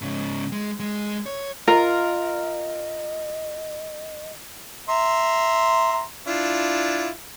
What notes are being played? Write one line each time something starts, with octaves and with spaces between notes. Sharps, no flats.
G#2 C#3
G#3
G#3
C#5
F4 A#4 D#5 A#5
E5 A#5 C6
D4 E4 F4